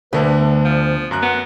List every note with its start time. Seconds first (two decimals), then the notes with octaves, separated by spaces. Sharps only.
0.13 D2 D3 A3 D4 B4
0.40 B3
0.65 F3
1.11 F#2 A#5 F#6
1.23 B3 F#5